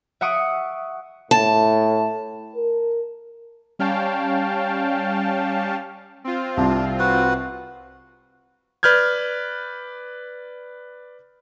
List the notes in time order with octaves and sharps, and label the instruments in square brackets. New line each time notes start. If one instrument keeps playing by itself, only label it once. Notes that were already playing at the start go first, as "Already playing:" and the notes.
[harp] E5 F#5 C#6 D#6 D7 D#7
[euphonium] A2 [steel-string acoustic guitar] A5
[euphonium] A#4
[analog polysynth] G3 C#4 F5 G5 A5
[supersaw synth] C4 F4
[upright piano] C2 [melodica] D4
[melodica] F#4 B4 F#5
[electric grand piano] B4 D5 F6 G6 G#6